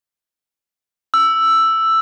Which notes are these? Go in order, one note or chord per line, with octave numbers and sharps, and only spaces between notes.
E6